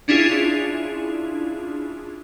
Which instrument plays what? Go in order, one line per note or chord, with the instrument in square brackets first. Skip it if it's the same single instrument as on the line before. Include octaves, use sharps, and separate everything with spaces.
[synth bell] C#4 D4 E4 F4 G#4